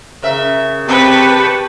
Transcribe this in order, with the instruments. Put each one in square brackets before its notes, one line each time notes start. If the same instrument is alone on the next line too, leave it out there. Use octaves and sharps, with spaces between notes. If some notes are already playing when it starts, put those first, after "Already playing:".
[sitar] C#3 A#4 E5
[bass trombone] C4 [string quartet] G4 A5 C#6 [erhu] B4